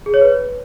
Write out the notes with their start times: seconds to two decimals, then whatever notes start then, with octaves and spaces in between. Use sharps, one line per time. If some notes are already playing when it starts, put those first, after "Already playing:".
0.06 G#4
0.14 C#5
0.21 B4